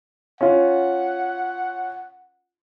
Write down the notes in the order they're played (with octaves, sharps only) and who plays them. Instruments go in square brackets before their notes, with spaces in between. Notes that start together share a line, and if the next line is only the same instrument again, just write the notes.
[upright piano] C#4 F4 [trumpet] F#5